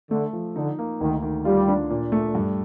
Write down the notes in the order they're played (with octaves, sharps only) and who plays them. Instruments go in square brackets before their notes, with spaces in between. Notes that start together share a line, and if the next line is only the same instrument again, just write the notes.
[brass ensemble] D3 [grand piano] A3
[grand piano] F3
[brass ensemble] D3 [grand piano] D#4
[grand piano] A#3
[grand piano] D2 [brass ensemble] D#3
[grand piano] D#3
[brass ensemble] G3 [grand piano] F4
[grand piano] D4
A#2
A3
G2